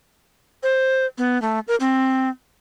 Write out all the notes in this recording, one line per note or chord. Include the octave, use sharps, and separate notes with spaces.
C5
B3
A3
A#4
C4